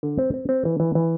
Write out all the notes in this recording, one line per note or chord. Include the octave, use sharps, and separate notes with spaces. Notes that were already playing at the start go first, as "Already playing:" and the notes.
D3
C4
C4
C4
E3
E3
E3